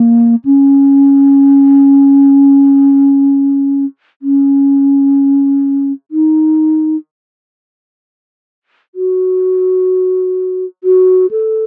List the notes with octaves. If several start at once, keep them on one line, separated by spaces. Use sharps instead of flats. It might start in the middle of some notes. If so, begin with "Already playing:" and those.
Already playing: A#3
C#4
C#4
D#4
F#4
F#4
A4